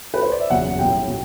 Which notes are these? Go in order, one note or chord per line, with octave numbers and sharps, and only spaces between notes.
B4
C5
D5
E5
F#1 E2 B2 F#3 F#5
B1 A2 G3 G5
B2 F#3